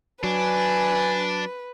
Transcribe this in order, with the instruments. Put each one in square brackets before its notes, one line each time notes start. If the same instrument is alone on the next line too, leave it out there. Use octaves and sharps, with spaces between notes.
[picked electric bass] F#3 [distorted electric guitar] D4 [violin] B4 [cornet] G#5